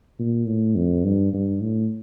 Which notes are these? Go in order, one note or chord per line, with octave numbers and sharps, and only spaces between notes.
A#2
A2
F2
G2
G2
A2